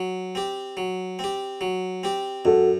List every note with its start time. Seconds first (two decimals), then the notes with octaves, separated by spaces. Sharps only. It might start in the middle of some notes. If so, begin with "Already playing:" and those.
Already playing: F#3
0.35 C4 G4
0.77 F#3
1.19 C4 G4
1.61 F#3
2.03 C4 G4
2.45 F#2 F#4 A4